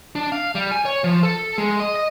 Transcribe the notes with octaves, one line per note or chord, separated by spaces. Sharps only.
D4
F5
G3
G#5
C#5
F3
A4
G#3
D#5
D#5